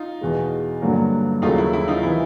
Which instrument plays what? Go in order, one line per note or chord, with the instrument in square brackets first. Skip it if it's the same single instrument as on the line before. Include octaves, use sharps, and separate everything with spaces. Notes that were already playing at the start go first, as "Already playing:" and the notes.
Already playing: [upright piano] D#4 F4
[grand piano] E2 B2 G#3
G2 D3 F#3 A#3
[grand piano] D#2 C#3 F#3 A3 [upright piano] D#4 F4
[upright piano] E4
E4
D#4 F4
[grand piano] C3 E3 [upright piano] E4